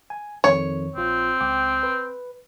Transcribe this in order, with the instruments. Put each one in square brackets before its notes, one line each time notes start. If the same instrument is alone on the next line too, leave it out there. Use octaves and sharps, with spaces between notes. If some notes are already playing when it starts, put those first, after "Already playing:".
[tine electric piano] G#5
[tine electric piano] F2 D#3 [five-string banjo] C#5
[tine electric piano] A#1 F4 [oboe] C4
[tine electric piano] C#2 G5 D6
B4